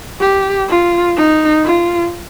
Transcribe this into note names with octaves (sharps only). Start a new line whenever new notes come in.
G4
F4
D#4
F4